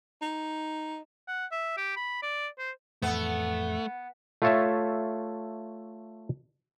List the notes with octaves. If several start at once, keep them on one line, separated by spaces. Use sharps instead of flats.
D#4
F#5
E5
G4
B5
D5
C5
F2 A2 E3 A3 B3
A3 F4 A4 C#5 E5 A5